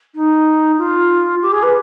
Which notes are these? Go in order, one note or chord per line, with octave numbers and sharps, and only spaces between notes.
D#4
F4
G4
G#4
B4